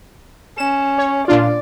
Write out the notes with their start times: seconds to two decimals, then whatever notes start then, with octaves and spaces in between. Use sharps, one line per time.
0.58 C#4 E7
0.98 C#5
1.28 A#2 D4 F4 D5